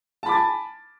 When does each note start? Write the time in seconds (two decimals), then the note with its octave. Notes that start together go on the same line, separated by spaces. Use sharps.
0.23 A5
0.26 B5
0.29 D6
0.32 A6
0.35 G#5